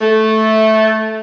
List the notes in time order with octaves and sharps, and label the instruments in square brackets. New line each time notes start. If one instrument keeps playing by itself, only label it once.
[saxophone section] A3